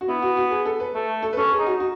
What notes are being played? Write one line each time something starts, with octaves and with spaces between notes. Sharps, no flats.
F#4
B3 E4
F#4
F#4
G#4
A4
B4
A3 A4
A4
B4
C#4 A4
G#4
D#4
F#4
F#4